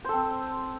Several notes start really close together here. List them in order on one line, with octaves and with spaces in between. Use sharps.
C5 A4 C4